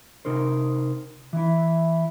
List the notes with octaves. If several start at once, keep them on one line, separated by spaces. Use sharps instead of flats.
C3 D#4 A#4 C5
E3 E4